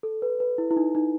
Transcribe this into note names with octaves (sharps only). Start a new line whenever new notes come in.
A4
B4
B4
E4
E4
D#4
D#4